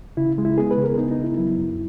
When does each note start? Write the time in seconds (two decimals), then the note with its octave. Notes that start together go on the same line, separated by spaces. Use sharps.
0.17 C#3 E4
0.38 G#3
0.45 E4
0.58 B3 G#4
0.71 B4
0.78 C#3
0.84 A#4
0.98 B3 D#4
1.11 D#4
1.18 C#3
1.24 E4
1.37 F#3 E4
1.57 F#2